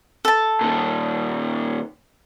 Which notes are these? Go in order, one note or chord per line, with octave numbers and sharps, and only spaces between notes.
A4 A5
A#2 D#3